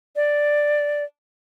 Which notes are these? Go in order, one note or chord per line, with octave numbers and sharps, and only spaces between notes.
D5